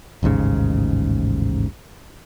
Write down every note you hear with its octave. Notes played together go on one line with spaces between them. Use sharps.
A1 D#2 G#2 C#3